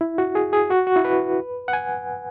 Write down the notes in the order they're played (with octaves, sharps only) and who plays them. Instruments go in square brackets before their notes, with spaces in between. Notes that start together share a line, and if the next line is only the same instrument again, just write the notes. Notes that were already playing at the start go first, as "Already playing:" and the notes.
[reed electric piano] E4
F#4
G#4
G#4
F#4
F#4
E4
B4
F#5
G#5